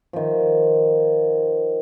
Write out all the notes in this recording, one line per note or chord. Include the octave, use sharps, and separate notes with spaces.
D#3 F3